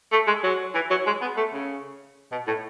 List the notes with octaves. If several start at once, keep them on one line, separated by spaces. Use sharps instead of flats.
A3
G#3
F#3
E3
F#3
G#3
B3
A3
C#3
B2
A2